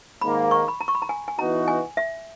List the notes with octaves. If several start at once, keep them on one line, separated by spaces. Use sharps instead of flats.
G#2 D#3 A#3 B5
C#6
B5
A#5
C#6
B5
A#5
G#5
G#5
E3 B3 D#4 F#4 A#5
G#5
E5